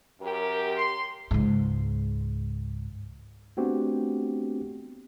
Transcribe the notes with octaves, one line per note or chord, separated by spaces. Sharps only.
F#2 G4 A#4
C6
C#2 G#2
A3 B3 C4 D4 F#4 G4